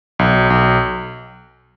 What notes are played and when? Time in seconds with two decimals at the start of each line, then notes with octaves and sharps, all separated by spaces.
0.19 B1
0.50 B1